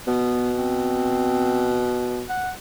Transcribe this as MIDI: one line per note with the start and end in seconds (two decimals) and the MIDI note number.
0.07 2.23 47
0.07 0.50 59
0.57 1.90 60
2.29 2.51 78